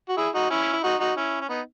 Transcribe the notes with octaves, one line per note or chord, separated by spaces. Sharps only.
F#4
E4 G#4
D#4 F#4
C#4 E4
E4
D#4 F#4
D#4 F#4
C#4 E4
C#4
B3 D#4